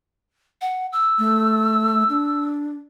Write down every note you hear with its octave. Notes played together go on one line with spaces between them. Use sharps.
F#5
E6
A3
D4